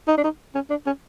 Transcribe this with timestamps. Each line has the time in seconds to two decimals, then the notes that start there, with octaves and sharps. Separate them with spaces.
0.08 D#4
0.18 D4
0.24 D#4
0.55 C#4
0.70 D4
0.86 C#4